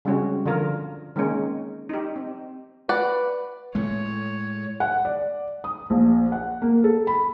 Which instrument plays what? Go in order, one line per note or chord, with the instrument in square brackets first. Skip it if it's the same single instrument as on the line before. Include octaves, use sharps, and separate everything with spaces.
[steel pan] C#3 G3 G#3 C4 C#4 F#4
D3 F3 F4 A#4
D#3 G#3 A#3 C4 C#4 D#4
D#4 G4
C4
[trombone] B4 [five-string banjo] D5 F#5
[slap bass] A2 G#3 A3 [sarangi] C#5
[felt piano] F#5
D5
D#6
A#1
F#5
A#3
A4
B5